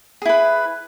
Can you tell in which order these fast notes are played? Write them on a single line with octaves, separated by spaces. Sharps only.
G#4 E4 B4